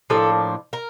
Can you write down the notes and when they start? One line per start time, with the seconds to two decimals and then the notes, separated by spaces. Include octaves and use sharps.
0.10 A2 F3 A#3 D4 A4
0.73 A#4